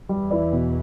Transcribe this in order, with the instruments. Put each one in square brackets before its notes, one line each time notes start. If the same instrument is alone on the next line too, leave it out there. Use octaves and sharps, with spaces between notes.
[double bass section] E2 E3 [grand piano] G3
[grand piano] E4 B4 D5
B2